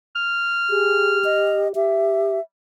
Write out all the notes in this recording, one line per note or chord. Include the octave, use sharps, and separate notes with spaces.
F6
G4 G#4
D#5
G4 E5